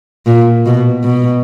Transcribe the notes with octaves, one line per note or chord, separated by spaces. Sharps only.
A#2
B2
B2